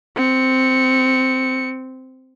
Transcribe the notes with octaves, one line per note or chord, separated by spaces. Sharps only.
C4 C#7